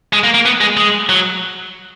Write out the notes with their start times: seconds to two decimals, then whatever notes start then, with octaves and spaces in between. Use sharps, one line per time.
0.13 G#3
0.24 A#3
0.34 A#3
0.45 B3
0.61 G#3
0.77 G#3
1.09 F#3